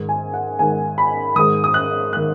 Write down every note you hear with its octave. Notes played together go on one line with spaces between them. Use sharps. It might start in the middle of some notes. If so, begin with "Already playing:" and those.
Already playing: G#2 D#3
G#5
F#5
G#2 D#3 G#5
B5
G#2 D#3 D#6
D#6
F#6
D#3 F#6